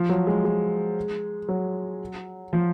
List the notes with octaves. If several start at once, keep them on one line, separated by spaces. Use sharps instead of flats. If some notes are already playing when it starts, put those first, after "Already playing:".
Already playing: F3
F#3
G#3
G#3
F#3
F3